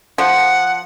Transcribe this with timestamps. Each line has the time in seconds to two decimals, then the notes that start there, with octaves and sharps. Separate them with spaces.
0.18 F3 F#5